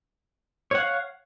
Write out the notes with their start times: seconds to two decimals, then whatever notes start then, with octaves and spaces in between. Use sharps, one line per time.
0.71 C#5
0.75 F#5
0.79 F5